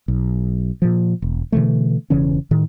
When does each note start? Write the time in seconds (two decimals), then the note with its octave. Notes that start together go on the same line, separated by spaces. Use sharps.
0.08 B1
0.82 A#2 F3
1.22 E1
1.52 B2 D3 E3 A3
2.10 E1 C#3 E3 C#4
2.51 A2 D#3